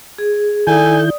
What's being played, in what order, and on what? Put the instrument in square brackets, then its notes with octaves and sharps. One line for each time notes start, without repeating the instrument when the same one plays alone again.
[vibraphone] G#4
[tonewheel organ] D#3 E4 G6 [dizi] A4 [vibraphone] D5 D#6 [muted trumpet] G#5